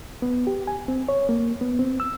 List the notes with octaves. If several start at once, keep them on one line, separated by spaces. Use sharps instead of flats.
B3
G4
G#5
C4
C#5
A#3
B3
C4
E6